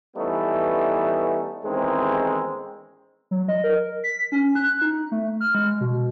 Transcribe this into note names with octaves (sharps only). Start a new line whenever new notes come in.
E3 G3 A3 B3 C#4 D#4
A1 E2 D#3 G#3 C4
F#3
D#5
A#4
B6
C#4
F#6
D#4
A3
F6
G#3
B2